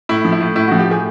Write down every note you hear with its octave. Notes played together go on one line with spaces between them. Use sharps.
A2 E4
F3
E4
A2
A2 E4
F3 F#4
G4
A2 G#4